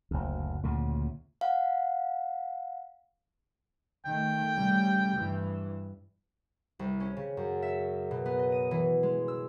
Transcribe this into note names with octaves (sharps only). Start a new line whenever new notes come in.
F#1 D2
D2 A#2 C#3
F5 F#5
D#3 A3 G5
C#3 G3 A3
G2 E3
C2
C#4
C#3
F#2
E5
B2
B3
D#5
D#7
E3
G#3
E6